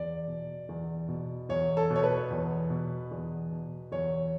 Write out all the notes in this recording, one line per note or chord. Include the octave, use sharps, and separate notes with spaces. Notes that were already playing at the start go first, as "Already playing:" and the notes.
Already playing: E2 D5
B2
E2
B2
E2 C#5
A4
B2
C#5
B4
E2
B2
E2
B2
E2 C#5